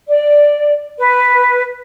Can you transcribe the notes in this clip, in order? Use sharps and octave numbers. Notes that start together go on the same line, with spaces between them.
D5
B4